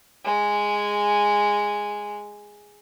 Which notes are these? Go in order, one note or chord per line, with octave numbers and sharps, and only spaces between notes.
G#3 G#5